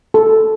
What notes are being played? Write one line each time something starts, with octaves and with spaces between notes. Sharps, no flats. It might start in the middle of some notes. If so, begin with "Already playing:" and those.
A4